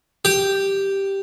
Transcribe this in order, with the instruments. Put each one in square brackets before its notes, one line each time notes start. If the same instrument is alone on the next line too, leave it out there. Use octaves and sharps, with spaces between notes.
[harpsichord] G4